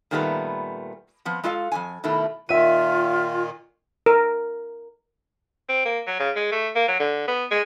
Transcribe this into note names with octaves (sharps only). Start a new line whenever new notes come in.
A#2 D#3 G3 A3 B3 B4
F3 B3 C4
G#3 F4 A4 E5 F5
F2 G#2 G#5
B2 D#3 A3 E4
A#2 D#3 F4 E5 D#7
A#4
C4
A#3
F#3
C#3
G#3
A3
A#3
F#3
D3
B3
G#3